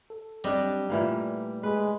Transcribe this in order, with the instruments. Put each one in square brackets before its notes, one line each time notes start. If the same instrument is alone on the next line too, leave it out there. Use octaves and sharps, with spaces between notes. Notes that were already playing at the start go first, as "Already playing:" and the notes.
[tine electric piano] A4
[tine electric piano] F#3 C4 [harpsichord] G3 [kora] D4 D#5
[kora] A#2 E3 A#3 [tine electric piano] A3
[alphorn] G#3 [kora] B4